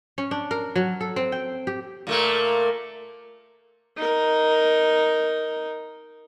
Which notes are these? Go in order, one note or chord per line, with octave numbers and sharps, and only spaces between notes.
C#4
D4
A#4
F#3
A4
C4
G5
G4
A#2 A3 A#3
D#4 A#4